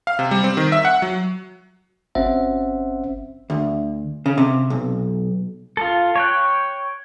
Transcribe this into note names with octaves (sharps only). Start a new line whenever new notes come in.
F5
C3
G3
C4
D#3
E5
F#5
F#3
G1 C4 C#4 C5 E5 F#5
D2
C#3
C3
B1
F4 A4
C#5 G5 F#6